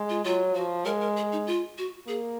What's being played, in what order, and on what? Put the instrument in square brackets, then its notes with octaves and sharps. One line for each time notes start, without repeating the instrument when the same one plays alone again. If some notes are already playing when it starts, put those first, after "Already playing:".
Already playing: [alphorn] G#3
[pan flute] F4
[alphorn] F#3 [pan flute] F4
[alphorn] F3 [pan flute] F#4
[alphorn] G#3 [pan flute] A#4
[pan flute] A#4
G#4
D#4
F4
F#4
[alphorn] A#3 [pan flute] G#4